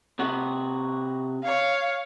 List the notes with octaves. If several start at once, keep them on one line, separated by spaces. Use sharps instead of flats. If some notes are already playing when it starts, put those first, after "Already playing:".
C3 F#4
C#5 F5